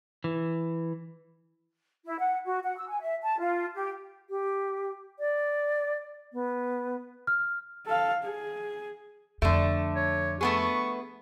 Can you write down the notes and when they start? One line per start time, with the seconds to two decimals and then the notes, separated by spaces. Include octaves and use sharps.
0.24 E3
2.05 E4
2.19 F#5
2.45 F#4
2.64 F#5
2.77 E6
2.89 G#5
3.01 E5
3.22 A5
3.39 F4
3.75 G4
4.30 G4
5.19 D5
6.33 B3
7.27 F6
7.86 A4 F5
8.24 G#4
9.42 F2 D3 A3
9.96 C#5
10.41 A3 B3 G#4 C#6